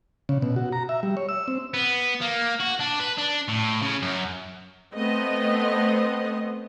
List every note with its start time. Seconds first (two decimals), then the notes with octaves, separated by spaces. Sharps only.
0.29 C#3
0.42 B2
0.56 F#4
0.72 A#5
0.89 E5
1.03 G3
1.17 C#5
1.29 E6
1.48 C4
1.74 B3
2.21 A#3
2.61 F#4
2.80 D4
3.00 B4
3.18 D4
3.48 A2
3.82 C#3
4.02 F#2
4.94 A3 B3 C4 D#5